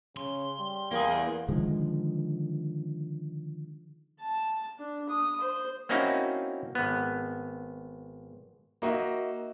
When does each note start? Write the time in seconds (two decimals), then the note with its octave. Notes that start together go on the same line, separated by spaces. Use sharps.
0.17 C#3 C6
0.59 G3
0.91 E2 A#3 G#4
1.49 D3 D#3 F3 G#3
4.20 A5
4.79 D4
5.09 D#6
5.41 C5
5.89 A#3 C4 C#4 D#4 E4 F#4
6.75 G#1 B3
8.82 A#3 D#4 F#4 D#5 E5